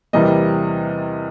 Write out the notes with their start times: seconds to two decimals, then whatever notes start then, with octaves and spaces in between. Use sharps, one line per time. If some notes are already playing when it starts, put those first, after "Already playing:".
0.13 E2 C3 E3 G3 A#3 D#5